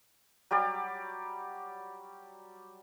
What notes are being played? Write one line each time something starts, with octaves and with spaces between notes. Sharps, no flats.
F#3 G3 G4 D5